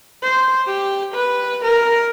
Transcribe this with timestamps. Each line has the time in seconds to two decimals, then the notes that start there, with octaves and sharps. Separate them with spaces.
0.23 C5
0.66 G4
1.15 B4
1.65 A#4